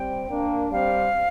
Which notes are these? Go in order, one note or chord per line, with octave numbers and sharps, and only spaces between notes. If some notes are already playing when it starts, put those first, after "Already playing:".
Already playing: G3 C4 G5
A#3 D4
G3 C4 F5